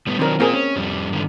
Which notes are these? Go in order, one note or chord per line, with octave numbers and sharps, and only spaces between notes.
A2 G3 B3
D#3 F#3 C4 D4 A#4
A#3 C4 F4 G#4 A#4
C#4
F2 G3
G2 D3 D#3